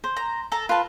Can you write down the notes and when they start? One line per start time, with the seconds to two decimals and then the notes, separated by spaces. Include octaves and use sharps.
0.04 C5
0.17 A#5
0.52 A4 A5 A#5
0.69 F4 B4 A5